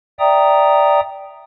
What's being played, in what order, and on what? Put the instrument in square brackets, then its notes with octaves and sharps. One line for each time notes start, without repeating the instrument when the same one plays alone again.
[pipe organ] D5 E5 G5 A#5 D#6